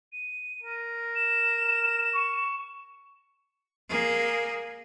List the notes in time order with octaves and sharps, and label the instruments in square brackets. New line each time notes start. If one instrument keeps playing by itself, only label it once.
[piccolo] D#7
[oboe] A#4
[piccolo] E7
[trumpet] C#6
[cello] A#3 G#4